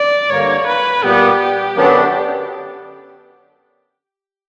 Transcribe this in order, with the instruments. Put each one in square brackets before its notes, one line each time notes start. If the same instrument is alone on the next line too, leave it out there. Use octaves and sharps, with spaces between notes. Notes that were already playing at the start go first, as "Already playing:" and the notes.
Already playing: [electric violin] D5
[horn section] G2 D3 A#3 [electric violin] C#5
[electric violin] B4
[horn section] A#2 G3 B3 [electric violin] G4
[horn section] F#2 D3 F#3 B3 D4